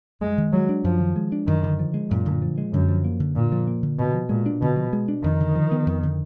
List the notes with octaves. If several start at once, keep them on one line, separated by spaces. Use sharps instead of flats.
F#2 G#3
D#3
F#3 G#3
D4
F#2 F3
D#3
G#3
D4
F#2 D#3
D3
F3
G#3
F#2 A#2
D3
F3
G#3
F#2 D3
F3
A#3
D3
A#2 D3
F3
A#3
D3
B2 D3
F3
A#2 G#3
D4
B2 D3
F3
G#3
D4
F2 D#3
D3
F3
B3
F2
D3